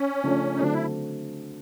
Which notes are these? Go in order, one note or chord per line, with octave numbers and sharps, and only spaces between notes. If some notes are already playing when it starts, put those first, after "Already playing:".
Already playing: C#4
C#3 F3 A3 D4
D#4
D3 F#3 A3 C4 D4
E4